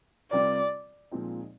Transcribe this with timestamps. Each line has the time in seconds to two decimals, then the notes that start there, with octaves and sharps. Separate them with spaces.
0.31 C3 G3 C4 F4 A#4 D5
1.11 A#2 F3 G#3 C4 D#4